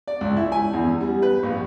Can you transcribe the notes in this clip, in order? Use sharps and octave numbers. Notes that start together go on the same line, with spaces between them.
D5
C#2
E4
G#5
E2
G3
B4
A#1